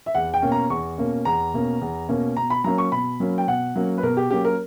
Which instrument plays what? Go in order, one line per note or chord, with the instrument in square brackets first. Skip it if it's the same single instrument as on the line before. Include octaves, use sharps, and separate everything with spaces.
[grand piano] E5
E2 F#5
G5
B2 A#3 C#4
A#5
E2 C#6
B2 A#3 C#4
E2 A#5
B2 A#3 C#4
E2
B2 A#3 C#4
B2 A#5
B5
F#3 A#3 C#4 A#5
C#6
B2 B5
F#3 A#3 C#4
G5
B2 F#5
F#3 A#3 C#4
B4
B2 A#4
G4
F#3 A#3 C#4 G4
A#4